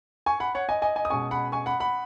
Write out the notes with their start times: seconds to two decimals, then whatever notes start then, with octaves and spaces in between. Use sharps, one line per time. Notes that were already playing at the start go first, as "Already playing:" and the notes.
0.26 G#5 C#6
0.40 F#5 B5
0.55 C#5 F#5
0.69 D#5 G#5
0.82 D#5 G#5
0.96 D#5 G#5
1.05 D#6
1.10 B2 G#3 C#4 G#5 C#6
1.31 F#5 B5
1.52 G#5 C#6
1.66 F#5 B5
1.80 F#5 B5